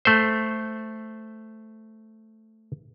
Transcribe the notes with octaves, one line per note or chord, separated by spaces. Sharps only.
A3 C5